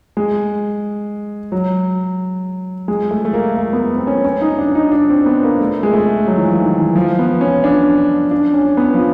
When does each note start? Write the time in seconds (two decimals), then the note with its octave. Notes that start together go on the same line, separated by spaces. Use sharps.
0.17 G#3
1.52 F#3
2.88 G#3
3.11 A3
3.25 A3
3.33 A#3
3.56 A#3
3.73 B3
3.96 C4
4.07 C#4
4.25 C#4
4.41 D#4
4.59 D4
4.75 D#4
4.92 D4
5.09 C4
5.26 B3
5.43 A#3
5.61 A3
5.83 G#3
5.94 A3
6.27 F#3
6.37 E3
6.45 F3
6.61 D#3
6.79 E3
6.96 F3
7.19 B3
7.41 C#4
7.64 D4
8.31 D4
8.54 C#4
8.77 B3
8.94 F3